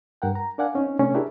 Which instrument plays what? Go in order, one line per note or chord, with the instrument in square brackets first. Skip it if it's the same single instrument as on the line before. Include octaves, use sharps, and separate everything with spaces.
[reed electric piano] G2 A#4 F#5 G5
A#5
D4 A#4 D5 F5 F#5 G#5
C4 C#4 D#4
C3 A3 C#4 D4
D4 E4 G4 G#4 A#4